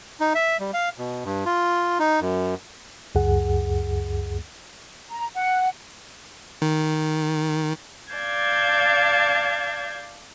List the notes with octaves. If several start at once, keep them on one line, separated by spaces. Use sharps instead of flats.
D#4
E5
G3
F5
B2
G2
F4
D#4
F#2
C#2 F#2 G#4 F#5
A#5
F#5
D#3
D5 F5 A5 G6 G#6